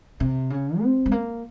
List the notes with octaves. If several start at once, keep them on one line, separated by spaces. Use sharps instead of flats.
C3
C#3
C4
G#3
A#3